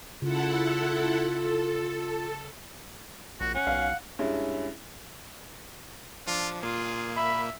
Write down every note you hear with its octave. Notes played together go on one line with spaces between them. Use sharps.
C#3 E4 F4 A4 F#5
A4
A#1 F#4
C#4 F#5
B1 F5
G2 G#3 C#4 E4
F3 D4 F4
A#2 A#3 F4 G#4
E5 B5